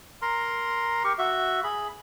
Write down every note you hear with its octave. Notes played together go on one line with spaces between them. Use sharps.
A#4 A#5 C6
G4 A#4 C#6
F#4 E5
G#4 B5